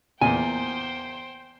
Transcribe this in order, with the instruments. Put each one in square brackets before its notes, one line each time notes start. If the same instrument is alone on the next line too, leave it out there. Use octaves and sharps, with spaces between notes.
[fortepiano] E2 A#2 [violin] C5 G5 [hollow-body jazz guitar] G#5